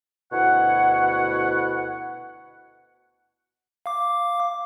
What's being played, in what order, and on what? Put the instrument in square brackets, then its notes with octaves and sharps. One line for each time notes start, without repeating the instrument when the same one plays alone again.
[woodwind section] D2 B2 E4 C#5 F#5
[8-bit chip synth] F5 D6